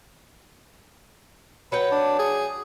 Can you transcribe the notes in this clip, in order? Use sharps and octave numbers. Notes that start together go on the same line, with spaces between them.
F#3 B4 F#5 G5
D4
G#4